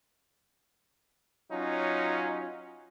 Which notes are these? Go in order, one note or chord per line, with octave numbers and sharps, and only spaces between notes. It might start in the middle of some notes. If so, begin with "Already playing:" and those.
F#3 C#4 D#4 F4